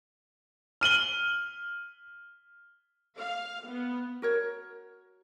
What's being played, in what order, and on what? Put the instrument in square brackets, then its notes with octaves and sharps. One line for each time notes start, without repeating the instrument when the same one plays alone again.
[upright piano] F6 D#7 F#7 G7
[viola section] F5
B3
[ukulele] F#4 A#4 C#5